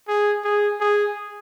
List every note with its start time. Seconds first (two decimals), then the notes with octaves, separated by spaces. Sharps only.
0.08 G#4
0.44 G#4
0.80 G#4